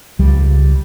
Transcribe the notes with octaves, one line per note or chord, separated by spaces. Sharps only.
C#2 G3